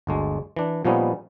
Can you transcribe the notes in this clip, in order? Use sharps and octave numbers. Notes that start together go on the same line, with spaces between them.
G1 D2 G#3
E3 D4
A#2 F3 G3 B3 C#4 D#4